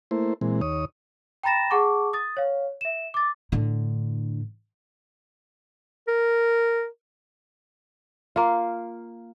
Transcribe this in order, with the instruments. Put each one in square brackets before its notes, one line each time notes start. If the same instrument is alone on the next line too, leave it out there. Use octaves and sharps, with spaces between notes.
[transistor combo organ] A3 A#3 E4 C5
A#2 E3 G#3 C4
D#2 C#5 D#6
[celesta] G5 A#5 B5 A6 A#6 E7
G#4 F#5 A5 C#6 D6
D#6 A6
C#5 F5
E5 E7
D6 A6
[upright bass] A2 D3
[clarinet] A#4
[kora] A#3 F4